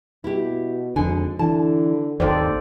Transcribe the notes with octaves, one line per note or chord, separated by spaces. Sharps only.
B2 E4 G4
G#1 F2 D3 G#5
D3 E3 A5
G#1 D#2 D#3 A4 C5 D5